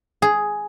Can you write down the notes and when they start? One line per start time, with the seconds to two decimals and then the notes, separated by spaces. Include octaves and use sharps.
0.22 G#4